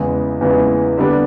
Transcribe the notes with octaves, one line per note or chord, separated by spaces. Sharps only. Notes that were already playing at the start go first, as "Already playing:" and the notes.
Already playing: E2 C#3 E3 G#3
E2 C#3 E3 G#3
D3 G3 B3 D4